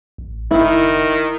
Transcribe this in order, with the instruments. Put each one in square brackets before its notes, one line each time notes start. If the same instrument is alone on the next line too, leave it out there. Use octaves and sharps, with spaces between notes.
[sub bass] A1
[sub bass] F#1 [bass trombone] D#3 [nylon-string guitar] E4